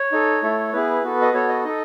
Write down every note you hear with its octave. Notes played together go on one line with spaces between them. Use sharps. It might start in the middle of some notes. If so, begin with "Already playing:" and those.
Already playing: C#5
D#4 A4
A3 E4 A4
B3 E4 G#4 B4
B3 F#4 A4
D#5
B3 F#4 A4 C#5
D#5
D#4 A4 D#5